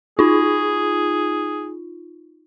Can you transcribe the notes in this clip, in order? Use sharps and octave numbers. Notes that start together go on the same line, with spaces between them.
D#4 F4 G#4